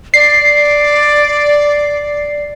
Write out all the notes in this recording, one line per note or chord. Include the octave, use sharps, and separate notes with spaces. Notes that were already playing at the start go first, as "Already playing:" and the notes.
D5 C7